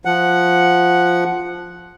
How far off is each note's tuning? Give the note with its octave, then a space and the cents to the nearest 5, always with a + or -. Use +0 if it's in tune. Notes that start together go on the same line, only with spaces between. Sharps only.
F3 +0 F#5 +0